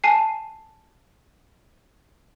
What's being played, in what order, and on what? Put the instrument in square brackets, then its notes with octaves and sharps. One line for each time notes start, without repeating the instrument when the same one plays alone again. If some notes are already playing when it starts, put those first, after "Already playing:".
[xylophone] G#5 A5 C7